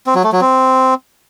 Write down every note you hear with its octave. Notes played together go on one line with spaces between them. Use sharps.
C4
F#3
A3
F#3
C4